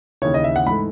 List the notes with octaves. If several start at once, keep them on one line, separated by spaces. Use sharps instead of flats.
D#2 C#3 E3 C#5
D#5
E5
F#5
G#2 E3 A3 B5